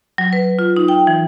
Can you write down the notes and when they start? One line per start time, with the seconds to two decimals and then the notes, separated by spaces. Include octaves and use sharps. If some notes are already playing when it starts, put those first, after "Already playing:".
0.18 F#3
0.33 B4
0.59 F4
0.76 D#4
0.88 G5
1.07 E3